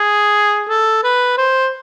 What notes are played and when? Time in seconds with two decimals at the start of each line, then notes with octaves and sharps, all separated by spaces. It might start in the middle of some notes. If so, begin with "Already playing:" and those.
Already playing: G#4
0.69 A4
1.04 B4
1.38 C5